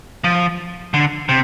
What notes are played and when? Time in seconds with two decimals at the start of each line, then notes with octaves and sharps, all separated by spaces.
0.24 F3
0.94 D3
1.29 C3